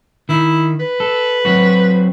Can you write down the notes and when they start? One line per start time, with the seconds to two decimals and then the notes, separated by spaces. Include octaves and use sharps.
0.29 D#3 E4
0.79 B4
1.00 A4
1.45 F#3 C4 F#4